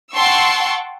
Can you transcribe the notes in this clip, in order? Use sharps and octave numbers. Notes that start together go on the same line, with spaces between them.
F#5 G5 A5 C6 C#6 E6